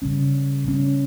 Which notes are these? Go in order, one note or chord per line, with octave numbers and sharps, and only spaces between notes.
C#3 G3 C#4
C#3 G3 C#4